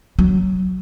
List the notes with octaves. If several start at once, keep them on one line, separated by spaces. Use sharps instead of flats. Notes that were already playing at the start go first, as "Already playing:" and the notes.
F#3